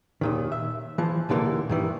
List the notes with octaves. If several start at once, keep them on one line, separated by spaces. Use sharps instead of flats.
D#2 A#2 D#3
E5
E3 F3
D#2 A#2 D3 E3 A#3
G2 D#3 E3